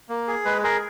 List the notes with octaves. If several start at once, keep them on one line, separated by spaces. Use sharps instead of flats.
A#3
G#4
G#3 B4
G#4 A#4